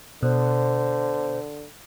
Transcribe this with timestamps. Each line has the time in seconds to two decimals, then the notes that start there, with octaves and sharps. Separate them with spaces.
0.23 B2 D3 C5